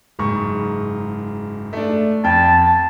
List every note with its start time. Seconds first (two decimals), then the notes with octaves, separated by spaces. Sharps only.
0.19 F#1 G#2 C#6
1.73 A3 D4
2.24 F2 G5 A5